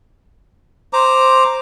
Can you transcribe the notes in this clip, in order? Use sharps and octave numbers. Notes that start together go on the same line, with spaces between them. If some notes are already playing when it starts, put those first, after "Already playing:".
C5 A#5 D6